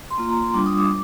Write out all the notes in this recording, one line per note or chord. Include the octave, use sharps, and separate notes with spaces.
C6
A#3 F4 A#5
A#5
C6
G3 D4 F4 D6
D#6
D6